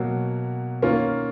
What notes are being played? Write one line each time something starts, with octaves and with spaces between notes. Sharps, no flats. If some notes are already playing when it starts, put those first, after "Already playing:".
Already playing: B2 F#3 A#3
D#3 A#3 C#4 F4